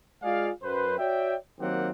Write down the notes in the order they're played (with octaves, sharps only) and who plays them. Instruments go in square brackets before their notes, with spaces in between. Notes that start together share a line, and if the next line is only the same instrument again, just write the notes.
[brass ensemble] G#3 F4 G#4 D5 F5
F#2 B4 C5
F#4 C#5 D5 E5 G5
D#3 F#3 A#3 C4 G4 F#5